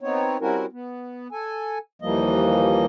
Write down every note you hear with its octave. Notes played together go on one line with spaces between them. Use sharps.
B3 C4 D#4 C#5
G3 C4 C#4 E4 F#4 A#4
B3
A4 G#5
D#2 E3 F3 G3 A#3 D#5